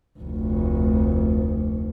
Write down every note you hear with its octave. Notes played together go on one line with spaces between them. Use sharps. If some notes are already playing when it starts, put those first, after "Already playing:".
F1 D2